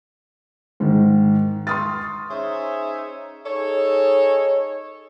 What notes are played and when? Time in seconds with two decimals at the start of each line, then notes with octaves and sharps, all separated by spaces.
0.80 G#2 D#3
1.67 C6 C#6 D#6 F6 A6
2.30 C#4 D#4 G#4 C5 C#5 E5
3.46 D#4 G#4 A4 C#5